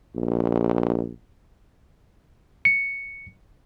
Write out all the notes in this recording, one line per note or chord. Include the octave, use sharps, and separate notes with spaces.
A#1
C#7